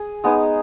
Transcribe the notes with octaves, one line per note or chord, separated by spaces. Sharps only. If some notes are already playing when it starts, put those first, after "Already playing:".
Already playing: G#4
G#3 B3 D#4 G#4